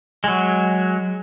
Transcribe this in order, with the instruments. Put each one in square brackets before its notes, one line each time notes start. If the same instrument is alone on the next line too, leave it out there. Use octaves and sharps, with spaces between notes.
[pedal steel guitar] F#3 G#3